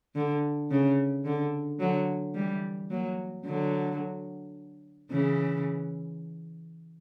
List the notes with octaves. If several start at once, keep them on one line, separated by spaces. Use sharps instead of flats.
D3
C#3
D3
D3 F#3
E3 G3
F#3 A#3
D3 F#3
C#3 E3